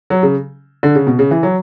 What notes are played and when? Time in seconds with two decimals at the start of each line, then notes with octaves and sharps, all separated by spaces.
0.10 F#3
0.23 C#3
0.83 D3
0.95 C#3
1.07 B2
1.19 C#3
1.31 E3
1.43 F#3